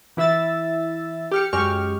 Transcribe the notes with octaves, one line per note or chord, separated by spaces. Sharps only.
E3 E4 E5 E6 A6
G4 F6 C#7
F#2 G#3 G4 C#6 F6